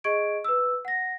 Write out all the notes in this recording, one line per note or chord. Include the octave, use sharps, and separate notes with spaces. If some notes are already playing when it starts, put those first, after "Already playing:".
G#4 D#5 C#6 G#6 D7
B4 E6
F#5 A#6